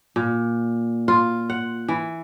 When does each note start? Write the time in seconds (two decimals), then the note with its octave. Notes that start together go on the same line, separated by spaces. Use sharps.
0.16 A#2
1.08 F4
1.50 F#5
1.88 E3